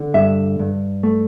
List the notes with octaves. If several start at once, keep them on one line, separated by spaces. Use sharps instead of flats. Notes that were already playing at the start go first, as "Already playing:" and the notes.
Already playing: D3
G2 E5
G2
A3